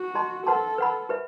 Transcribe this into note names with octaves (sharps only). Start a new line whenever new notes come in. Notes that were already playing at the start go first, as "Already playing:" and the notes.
Already playing: F#4
G4 D#5 A5 C6
A4 B4 F#5 A5 C6
B4 F#5 B5
G4 B4 E5